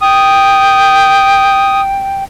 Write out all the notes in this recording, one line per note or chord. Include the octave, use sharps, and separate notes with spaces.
G5 D#6